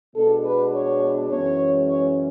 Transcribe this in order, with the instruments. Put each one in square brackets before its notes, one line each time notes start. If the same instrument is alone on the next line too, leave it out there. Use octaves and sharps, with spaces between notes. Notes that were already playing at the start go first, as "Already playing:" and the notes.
[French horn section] B2 G#3 B3 D4 A4
B4
C#5
F#2 E3 G#3 C#4 C#5
C#5